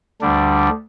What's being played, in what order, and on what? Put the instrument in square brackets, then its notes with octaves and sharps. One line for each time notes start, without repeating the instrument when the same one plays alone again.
[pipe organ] D2 D3 G3 D4